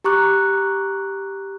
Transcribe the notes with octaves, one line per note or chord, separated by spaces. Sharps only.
G4 A#5 C#6 D6 F#6